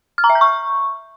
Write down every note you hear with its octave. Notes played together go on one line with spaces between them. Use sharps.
F6
A#5
E5
G6
C#6